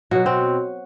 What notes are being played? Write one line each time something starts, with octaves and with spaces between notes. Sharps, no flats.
B2 F#3 F#4
C4